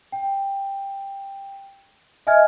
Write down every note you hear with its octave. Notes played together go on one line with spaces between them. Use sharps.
G5
D#5 E5 G#5 F6 G#6